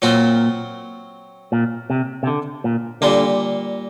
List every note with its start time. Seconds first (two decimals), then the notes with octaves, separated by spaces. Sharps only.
0.02 A#2 F#3 C4 F#4
1.52 A#2
1.90 C3
2.23 C3
2.27 D3
2.64 A#2
3.02 A#2 D3 G3 A#3